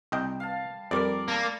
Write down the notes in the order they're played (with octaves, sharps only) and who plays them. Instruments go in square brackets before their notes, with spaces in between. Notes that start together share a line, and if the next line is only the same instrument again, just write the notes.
[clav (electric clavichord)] C2 D#5 G5 [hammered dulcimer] G3
[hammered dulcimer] F5 A5
[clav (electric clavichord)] F2 G3 [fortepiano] A#4 D5
[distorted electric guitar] A#3 [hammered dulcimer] A4 A#5 B5